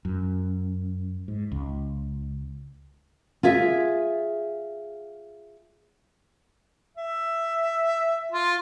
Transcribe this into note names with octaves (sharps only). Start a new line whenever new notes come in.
F#2
G#2
C#2
F4 G#4 E5
E5
F4